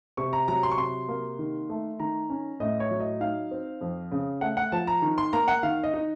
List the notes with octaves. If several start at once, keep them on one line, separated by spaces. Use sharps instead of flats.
C3 C#6
A#5
F#3 A#5
C6
C#6
C3 C6
A#3
D#3
A3
D#3 A#5
C#4
A2 D#5
C#5
F#3
D#5
D#4 F5
C4
F2
C#3
A3 F#5
F#5
F3 A5
A#5
D#3
C6
A#3 A#5
F#5
D#3 F5
D#5
D#4